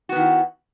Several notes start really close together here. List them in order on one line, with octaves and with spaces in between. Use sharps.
F#4 B3 D#3 E4